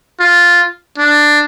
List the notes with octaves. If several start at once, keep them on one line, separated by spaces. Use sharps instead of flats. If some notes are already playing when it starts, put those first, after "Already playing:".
F4
D4